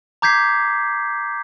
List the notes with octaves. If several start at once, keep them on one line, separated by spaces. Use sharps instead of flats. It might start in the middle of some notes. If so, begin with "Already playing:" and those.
A#5 D6 G6 G#6 B6 C7